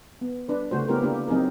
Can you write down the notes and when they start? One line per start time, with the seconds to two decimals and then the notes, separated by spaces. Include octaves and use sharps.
0.21 B3
0.49 D4 B4
0.71 C#3 A3 F#4 C5
0.89 A#3 B3 C#4 E4 G4 A#4
1.02 A#3 D4 G4
1.28 F#3 C4 D#4 G#4 A#4